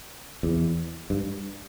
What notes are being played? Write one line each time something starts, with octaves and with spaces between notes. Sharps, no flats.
E2
G2